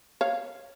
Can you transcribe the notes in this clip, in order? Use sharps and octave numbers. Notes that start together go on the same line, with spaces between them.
C#5 F5